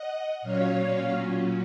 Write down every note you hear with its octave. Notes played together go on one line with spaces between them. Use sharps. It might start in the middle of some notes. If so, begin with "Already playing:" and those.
Already playing: D#5 F#5
A#2 F#3 C#4 C#5 F5